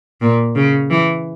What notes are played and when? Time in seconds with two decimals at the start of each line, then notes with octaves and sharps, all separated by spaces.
0.21 A#2
0.56 C#3
0.90 E3